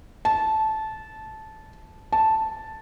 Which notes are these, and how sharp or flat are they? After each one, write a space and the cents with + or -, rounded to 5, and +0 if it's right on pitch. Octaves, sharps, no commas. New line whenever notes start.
A5 -15
A5 +0